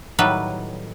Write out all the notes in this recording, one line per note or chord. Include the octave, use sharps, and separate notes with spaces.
A2 D#3 F#3 G3 B4